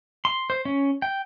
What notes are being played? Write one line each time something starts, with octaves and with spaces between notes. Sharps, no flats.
C6
C5
C#4
G5